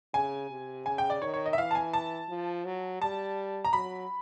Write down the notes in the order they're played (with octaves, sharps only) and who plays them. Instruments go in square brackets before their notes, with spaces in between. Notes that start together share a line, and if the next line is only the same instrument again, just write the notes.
[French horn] C#3 [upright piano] G#5
[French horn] C3
[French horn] C#3 [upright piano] G#5
[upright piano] G5
D5
[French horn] D#3 [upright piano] C#5
[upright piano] C#5
D#5
E5
[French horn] E3 [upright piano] F5
[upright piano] A5
G#5
A5
[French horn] F3
F#3
[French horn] G3 [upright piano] A5
[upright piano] A#5
[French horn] F#3 [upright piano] B5